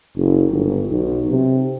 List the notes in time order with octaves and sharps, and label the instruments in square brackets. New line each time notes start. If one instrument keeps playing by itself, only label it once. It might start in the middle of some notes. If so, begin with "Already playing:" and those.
[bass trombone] F#1
G1
B1
C3